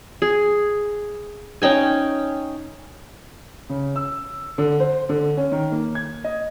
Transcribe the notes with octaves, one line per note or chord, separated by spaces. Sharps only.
G#4
C#4 D#4 G5 G#5
C#3
E6
D3
C5
D3
C#4
D#3
A#3
G#6
D#5